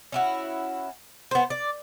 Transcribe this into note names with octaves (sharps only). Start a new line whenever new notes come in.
C#4 E4 F#4
B3 C5
D5